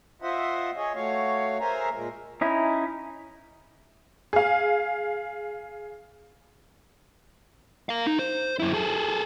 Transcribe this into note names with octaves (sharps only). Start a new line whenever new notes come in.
F4 C5 D#5 E5 F#5
G#4 C#5 D#5
A3 F#4 C#5 F5
G#4 A#4 C5 E5 G#5 A#5
A#2 G#3 A#4
C#4 D#4 E4
G#4 F5
A#4 F5
D#4
C5
F#2 E4
G#4 A4